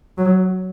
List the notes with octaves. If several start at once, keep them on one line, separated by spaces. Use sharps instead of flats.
F#3